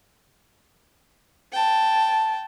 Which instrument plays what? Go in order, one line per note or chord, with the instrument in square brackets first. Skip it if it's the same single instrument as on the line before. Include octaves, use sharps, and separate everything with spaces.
[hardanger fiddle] G5 A5